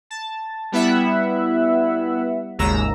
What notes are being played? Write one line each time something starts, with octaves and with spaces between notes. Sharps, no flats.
A5
G3 B3 E4 E5 F#5
G#1 D#2 G#2 C#3 A#5 E6